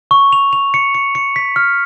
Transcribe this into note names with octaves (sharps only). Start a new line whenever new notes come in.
C#6
F7
F7
C#7
C#7
C#7
B6
F6